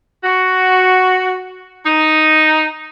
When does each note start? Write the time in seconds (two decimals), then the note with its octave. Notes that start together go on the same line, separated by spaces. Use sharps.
0.24 F#4
1.86 D#4